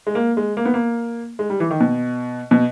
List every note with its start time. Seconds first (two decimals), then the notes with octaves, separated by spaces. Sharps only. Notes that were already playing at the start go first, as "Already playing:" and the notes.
0.07 G#3
0.15 A#3
0.37 G#3
0.57 A#3
0.65 B3
0.74 A#3
1.39 G#3
1.50 G3
1.60 E3
1.71 D#3
1.80 B2
2.51 B2